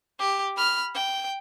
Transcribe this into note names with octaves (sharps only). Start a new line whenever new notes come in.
G4
B5 F6
G5